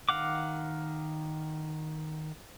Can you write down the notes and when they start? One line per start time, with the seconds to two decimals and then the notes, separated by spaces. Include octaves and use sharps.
0.09 D#3 F5 F#5 D6